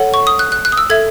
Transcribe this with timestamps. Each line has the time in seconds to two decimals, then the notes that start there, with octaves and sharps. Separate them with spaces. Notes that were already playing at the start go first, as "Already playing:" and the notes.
Already playing: A4 C#5 F#5
0.14 C#6
0.27 D#6
0.39 F#6
0.52 F#6
0.65 F#6
0.72 D#6
0.77 E6
0.90 A4 E5 G#6